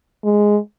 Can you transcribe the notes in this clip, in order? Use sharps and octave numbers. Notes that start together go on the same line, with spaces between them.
G#3